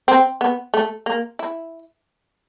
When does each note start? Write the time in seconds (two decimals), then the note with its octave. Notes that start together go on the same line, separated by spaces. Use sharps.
0.08 C4
0.41 B3
0.74 A3
1.06 A#3
1.39 E4